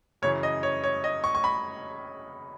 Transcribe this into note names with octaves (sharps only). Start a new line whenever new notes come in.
F#2 C#3 E3 C#5
D#5
C#5
C#5
D#5
C#6
C#6
B5